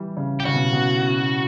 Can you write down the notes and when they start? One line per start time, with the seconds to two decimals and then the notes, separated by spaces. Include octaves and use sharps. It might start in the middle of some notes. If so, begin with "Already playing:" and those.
Already playing: E3 G3
0.17 C#3
0.40 G4
0.45 C#3 F#4
0.54 B2
0.73 B2